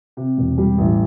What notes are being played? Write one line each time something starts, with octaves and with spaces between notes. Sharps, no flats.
C3
E1
G3
A1